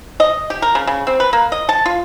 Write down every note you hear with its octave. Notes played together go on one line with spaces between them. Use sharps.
D#5
G4
A#4
C#3
C#3
C4
B4
A#3
D#5
A5
F4